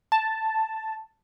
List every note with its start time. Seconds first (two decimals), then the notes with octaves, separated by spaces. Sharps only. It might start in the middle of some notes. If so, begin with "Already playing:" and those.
0.12 A5